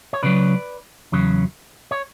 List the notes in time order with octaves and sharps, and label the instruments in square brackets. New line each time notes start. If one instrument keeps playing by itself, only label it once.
[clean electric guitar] C#5
C#2 C#3 F#3 B4 D5
E2 C#3 F#3
C#5